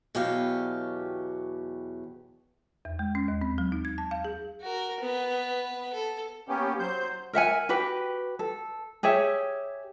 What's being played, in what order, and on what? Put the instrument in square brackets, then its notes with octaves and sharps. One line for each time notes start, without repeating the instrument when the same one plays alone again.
[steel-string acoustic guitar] E2 B2 F#3 G4 F5
[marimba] E2
G#3
C#4
D#2
C4
F#3
D#4
G#6
A5
F5
G#4
[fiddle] F#4 A#4
B3 B4
A4
[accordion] A#3 B3 C#4 G4
F#3 C5 G6
[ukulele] A#4 E5 F#5 G#5
F#4 G4 B4 G5
A4
G4 G#4 C#5 E5